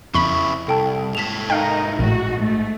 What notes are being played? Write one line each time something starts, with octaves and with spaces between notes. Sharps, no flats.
F2 C#3 E4 B5 C#6
C2 A4 G5 A5
G#2 A4 B6 E7 F7
D#4 A#4 D#5 F5 G5
A#1 A2 F#4
A3